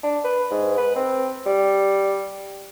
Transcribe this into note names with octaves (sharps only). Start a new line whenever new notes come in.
D4
B4
G#2
B4
C4
G3